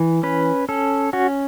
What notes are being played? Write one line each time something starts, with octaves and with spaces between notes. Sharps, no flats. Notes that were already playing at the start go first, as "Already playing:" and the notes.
Already playing: E3
C#4 B4
C#4 A4
C#4 F#4